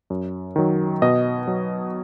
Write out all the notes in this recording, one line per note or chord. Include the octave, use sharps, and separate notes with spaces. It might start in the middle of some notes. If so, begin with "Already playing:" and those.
F#2
D#3 F#3
B2 D#5
F#3